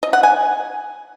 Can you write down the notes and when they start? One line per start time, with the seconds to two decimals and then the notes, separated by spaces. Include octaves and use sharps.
0.03 D#5
0.13 F#5
0.23 G#5